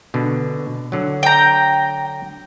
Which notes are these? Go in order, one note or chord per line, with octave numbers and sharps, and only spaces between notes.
B2 D3
D3 F#3
G5 A#5